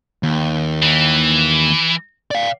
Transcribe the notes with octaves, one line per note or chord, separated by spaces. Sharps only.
D#2
E3
D5 F5